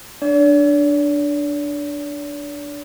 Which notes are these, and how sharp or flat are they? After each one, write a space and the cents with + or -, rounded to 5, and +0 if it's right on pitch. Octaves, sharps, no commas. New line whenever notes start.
D4 +0 D5 -45